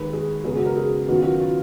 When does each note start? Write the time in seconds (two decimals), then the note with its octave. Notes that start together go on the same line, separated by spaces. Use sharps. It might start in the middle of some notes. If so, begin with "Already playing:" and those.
Already playing: D#2 D#3 G#3 B4
0.13 G#4
0.44 F#2 C#3 G#3 B3 G#4
0.55 F#4
0.66 A#4
0.77 G#4
1.08 F#2 D#3 F#3 B3 F#4
1.16 F4
1.23 F#4
1.40 F4